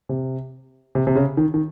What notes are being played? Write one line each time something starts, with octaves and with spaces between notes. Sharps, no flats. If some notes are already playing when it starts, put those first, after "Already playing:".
C3
C3
C3
C#3
D#3
D#3